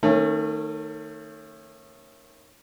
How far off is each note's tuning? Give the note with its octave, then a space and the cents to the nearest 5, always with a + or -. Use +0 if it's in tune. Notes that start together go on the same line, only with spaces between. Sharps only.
D#3 +0 A3 +30 C#4 -20